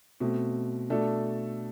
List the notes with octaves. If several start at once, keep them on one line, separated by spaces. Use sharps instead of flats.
B2 A3 C4
B2 A3 D4 A4